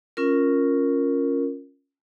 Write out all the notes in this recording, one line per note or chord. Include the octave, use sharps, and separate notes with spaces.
C#4 F4 A#4